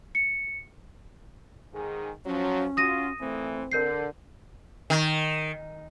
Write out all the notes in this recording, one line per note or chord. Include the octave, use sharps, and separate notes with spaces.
C#7
G#2 D#3 G#4
F3 F#3 C#4
F4 F#4 D#6 A#6 D#7
A#2 E3 A3 C4
D3 A#4 G6 C7
D#3